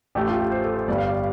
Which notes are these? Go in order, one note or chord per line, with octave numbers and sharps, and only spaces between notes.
A1 A2 A3 G4
F4
G4
C5
A4
C5
G1 G2 G3 D5
F5
D5